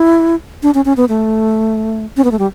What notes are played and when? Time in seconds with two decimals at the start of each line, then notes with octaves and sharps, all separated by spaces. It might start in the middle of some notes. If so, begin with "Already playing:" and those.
Already playing: E4
0.63 D4
0.74 C#4
0.85 C#4
0.97 B3
1.09 A3
2.17 C#4
2.24 B3
2.31 A3
2.39 G3